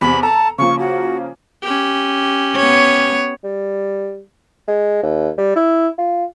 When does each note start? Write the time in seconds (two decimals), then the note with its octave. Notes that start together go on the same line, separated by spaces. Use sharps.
0.01 E2 C3 B5
0.23 A4 A5 A#5
0.58 C#3 F3 A#3 C#6
0.79 F#4
1.63 C#4 G4
2.56 B3 C#5
3.44 G3
4.68 G#3
5.03 D#2
5.38 G3
5.56 E4
5.98 F4